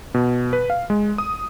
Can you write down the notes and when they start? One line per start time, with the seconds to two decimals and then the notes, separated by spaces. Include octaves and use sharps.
0.14 B2
0.53 B4
0.70 F5
0.90 G#3
1.18 D#6